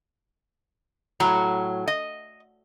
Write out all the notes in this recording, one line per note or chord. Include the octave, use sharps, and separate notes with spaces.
A2 F#3 A#5
D#5